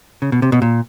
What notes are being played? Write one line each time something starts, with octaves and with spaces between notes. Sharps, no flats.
C#3
B2
C3
B2
A#2